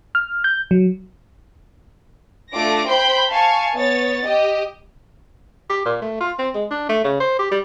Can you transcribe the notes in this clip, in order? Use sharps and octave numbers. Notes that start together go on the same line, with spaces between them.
F6
G6
F#3
A3 D4 F4 D6 A#6
C5 G5 B5 C6 G6
F5 G#5 A5 C#6
B3 C#5 A6
G4 D#5
G4
A#2
A3
F4
C4
G#3
D4
A3
C#3
C5
G4
G3